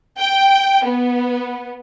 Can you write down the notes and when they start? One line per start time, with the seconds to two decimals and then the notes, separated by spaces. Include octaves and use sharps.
0.19 G5
0.86 B3